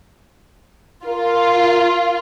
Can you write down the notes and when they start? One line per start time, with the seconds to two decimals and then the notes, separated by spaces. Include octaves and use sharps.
1.06 F4 A#4